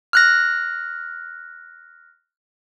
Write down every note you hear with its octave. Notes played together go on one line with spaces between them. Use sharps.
F6 F#6 A#6